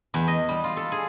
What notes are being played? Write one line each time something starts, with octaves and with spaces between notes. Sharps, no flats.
E2
D#5
G3
F4
A4
G#4